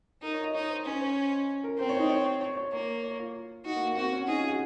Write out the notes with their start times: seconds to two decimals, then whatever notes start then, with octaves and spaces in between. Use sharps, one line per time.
0.22 D#4 A#4
0.33 C#5
0.44 D#5
0.54 D#4 C#5
0.69 C5
0.85 C#4 C5
1.00 C5
1.64 A#4
1.78 C4 C5
1.89 C#5
1.99 D#4
2.09 C#5
2.25 C#5
2.41 C#5
2.56 C#5
2.72 A#3 C#5
3.03 C#5
3.19 F4
3.65 D#4 F#4
3.76 A#3
3.86 A#3
3.96 C4 F#4
4.13 C#4
4.27 D#4 G#4
4.38 F4
4.48 F#4